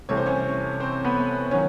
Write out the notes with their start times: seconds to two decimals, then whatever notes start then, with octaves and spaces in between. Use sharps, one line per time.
0.09 C2 C3 E3 A3 C#5
0.17 C5
0.26 C#4 C#5
0.80 C4 C5
1.04 B3 B4
1.51 D#3 F#3 C#4 C#5